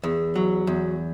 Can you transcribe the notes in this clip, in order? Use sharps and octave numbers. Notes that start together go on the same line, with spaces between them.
E2
F#3
E2